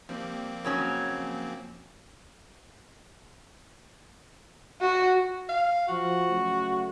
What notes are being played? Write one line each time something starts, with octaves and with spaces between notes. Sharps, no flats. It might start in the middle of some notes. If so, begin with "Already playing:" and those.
F3 G3 A#3 C4
C#3 F#3 C#4
F#4
F5
F3 F#4 F#5
C#3 F#3 A3